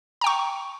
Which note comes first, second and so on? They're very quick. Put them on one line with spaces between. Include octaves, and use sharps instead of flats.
A#5 G5 C#6